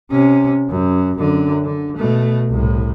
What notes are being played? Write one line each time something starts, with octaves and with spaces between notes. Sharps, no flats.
C3 C#4
F#2
F#2 D3
D3
B2 A3
C2 A2